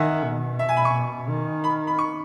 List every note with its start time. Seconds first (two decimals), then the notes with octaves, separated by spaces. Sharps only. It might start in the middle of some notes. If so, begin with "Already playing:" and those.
Already playing: D#3 E5 F#5 G#5
0.24 B2
0.59 E5
0.69 G#5
0.77 B5
0.85 C#6
0.94 B2
1.29 D#3
1.64 B5
1.87 B5
1.99 C#6